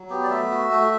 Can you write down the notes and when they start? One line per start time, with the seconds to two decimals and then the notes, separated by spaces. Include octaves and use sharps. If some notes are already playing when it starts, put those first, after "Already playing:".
Already playing: F#3
0.10 B3 G4
0.24 D5
0.30 A3 E5
0.51 F#4
0.71 A3